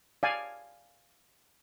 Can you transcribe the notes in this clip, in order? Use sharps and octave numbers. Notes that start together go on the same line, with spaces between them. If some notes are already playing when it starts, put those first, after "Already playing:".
D5 F5 G#5